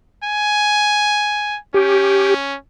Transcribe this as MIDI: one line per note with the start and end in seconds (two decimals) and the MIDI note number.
0.24 1.58 80
1.74 2.56 61
1.74 2.34 67